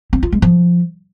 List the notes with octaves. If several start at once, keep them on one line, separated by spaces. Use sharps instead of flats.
C4
F4
G#3
F3